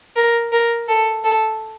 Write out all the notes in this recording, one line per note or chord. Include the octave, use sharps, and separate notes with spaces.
A#4
A#4
A4
A4